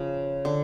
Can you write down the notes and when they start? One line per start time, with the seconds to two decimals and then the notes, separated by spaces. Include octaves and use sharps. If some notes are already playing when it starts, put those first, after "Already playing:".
Already playing: C#3 F3
0.45 D3